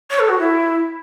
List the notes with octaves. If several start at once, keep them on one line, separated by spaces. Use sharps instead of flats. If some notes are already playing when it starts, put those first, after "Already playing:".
C#5
A4
F#4
E4